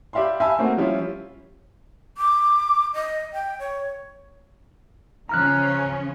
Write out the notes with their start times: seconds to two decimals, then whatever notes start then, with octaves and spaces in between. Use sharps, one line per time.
0.13 G4 D5 E5 F5 B5 C6
0.40 E5 F5 G#5 A5 B5 E6
0.58 A3 A#3 C4 F#4
0.77 F3 G3 C#4 E4 F4
2.18 D6
2.94 D#5
3.33 G5
3.59 C#5
5.29 C#3 F3 C#4 A#5 F6 F#6